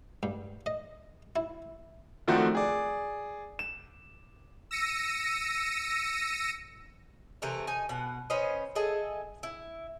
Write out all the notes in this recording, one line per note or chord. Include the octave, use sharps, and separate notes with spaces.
G2
D#5
E4
D3 D#3 F3 A3 C4 F#4
G#4 D5
E7
E6 A#6 C#7 D#7
C3 E3 A3 A#4
D#4 G#5
B2 F#5
C#4 B4 C5 D#5
G#4 A4 D#5 E5
E4